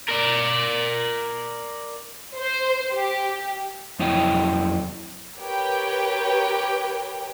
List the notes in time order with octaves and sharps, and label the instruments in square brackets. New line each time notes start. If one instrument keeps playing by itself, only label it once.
[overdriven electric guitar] A#4 D5
[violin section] C5
G4
[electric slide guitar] F2 F#3 E4 C#5 D#5 G5
[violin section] G4 A#4 B4 C#5 G5